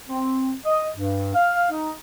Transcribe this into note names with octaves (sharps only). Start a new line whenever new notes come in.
C4
D#5
G2
F5
D#4